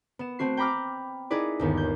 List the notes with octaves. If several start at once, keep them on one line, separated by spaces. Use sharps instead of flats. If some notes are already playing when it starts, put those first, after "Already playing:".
B3 E7
A3 C4 F#4 C7
G5 A#5 B5 D6 F6
D#4 E4 G#4 B4 D5
G1 D#2 B3
G6